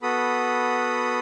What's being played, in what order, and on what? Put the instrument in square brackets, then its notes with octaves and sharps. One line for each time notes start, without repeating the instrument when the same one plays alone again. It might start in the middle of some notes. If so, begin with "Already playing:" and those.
[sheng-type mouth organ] B3 F#4 A4 B5 D#6